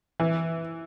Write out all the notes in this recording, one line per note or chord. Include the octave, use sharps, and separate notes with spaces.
E3